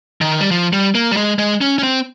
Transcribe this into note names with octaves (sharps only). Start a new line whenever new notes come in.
D#3
G3
F3
G3
A#3
G3
G#3
G#3
C#4
C#4
C4